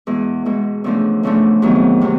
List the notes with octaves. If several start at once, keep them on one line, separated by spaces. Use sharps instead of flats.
E2 B2 G#3
E2 B2 G#3
E2 C#3 F3 A3 D4
E2 C#3 F3 A3 D4
F2 C3 D#3 F#3 B3
C3 D#3 F#3 B3